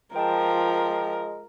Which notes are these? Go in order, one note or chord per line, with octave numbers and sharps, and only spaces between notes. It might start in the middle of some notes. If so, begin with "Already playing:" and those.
F3 G#3 A#4 G5 A5